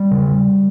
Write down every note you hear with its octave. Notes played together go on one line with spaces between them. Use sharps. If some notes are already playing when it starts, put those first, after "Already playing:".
Already playing: G3
C#3